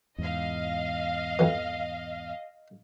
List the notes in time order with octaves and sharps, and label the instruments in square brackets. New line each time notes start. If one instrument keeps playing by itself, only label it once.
[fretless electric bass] E2 G#2 [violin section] D#5 F5
[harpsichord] F2 E3